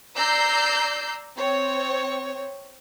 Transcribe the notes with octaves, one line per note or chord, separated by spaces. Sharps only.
D5 A#5 E6 G6 C7
C4 C#5